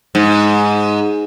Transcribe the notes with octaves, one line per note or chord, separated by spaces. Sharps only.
G#2